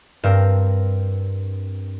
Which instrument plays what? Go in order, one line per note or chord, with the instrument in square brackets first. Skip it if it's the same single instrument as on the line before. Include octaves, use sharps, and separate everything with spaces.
[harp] G2 C4 A#4